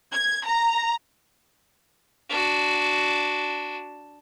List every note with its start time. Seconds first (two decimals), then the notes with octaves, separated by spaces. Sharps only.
0.14 G#6
0.46 A#5
2.29 D4 F#4